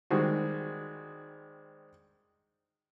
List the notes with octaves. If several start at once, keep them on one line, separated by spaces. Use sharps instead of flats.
D#3 G3 G#3 C4 F#4